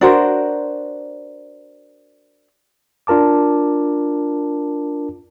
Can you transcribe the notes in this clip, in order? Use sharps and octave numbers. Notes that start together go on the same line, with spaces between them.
D4 F#4 A#4 C5
D4 F4 A#4 A5 D6